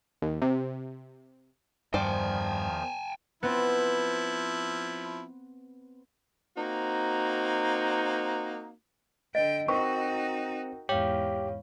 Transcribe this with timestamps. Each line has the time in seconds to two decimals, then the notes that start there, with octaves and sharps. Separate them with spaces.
0.22 D#2
0.42 C3
1.94 E2 G2 D#3 F3 C5 D5 G5 G#5
3.43 F3 B3 C4 E4
6.56 A#3 C4 D#4 F#4
9.35 D3 D#5 G5
9.68 C4 D#4 F#4 A#4 G5 C#6
10.89 E2 G#2 G4 C#5 F5